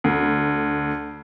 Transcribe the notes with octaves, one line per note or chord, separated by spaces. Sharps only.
D2